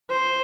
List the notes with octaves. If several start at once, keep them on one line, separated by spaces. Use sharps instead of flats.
C5